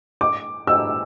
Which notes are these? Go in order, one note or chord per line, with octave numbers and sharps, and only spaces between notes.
D6
E6